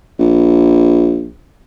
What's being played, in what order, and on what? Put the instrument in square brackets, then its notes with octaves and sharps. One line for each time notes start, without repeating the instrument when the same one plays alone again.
[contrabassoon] A#1